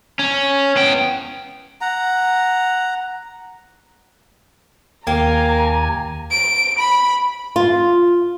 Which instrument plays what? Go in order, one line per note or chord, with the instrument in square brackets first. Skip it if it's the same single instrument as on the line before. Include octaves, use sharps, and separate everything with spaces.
[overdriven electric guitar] C#4
B3 G5
[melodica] F#5 A#5
[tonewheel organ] D#2 G#5 [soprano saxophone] A#3 [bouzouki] G4 [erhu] A#5
[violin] D7
B5
[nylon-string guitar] F4